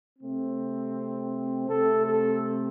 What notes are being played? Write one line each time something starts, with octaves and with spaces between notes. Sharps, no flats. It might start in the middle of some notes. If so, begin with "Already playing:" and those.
C3 A3 C4
C3 A3 C4 A4
A4